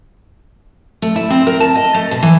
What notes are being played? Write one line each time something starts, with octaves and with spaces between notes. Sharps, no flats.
A3
E4
C4
A#4
A5
D#5
A3
B2
E3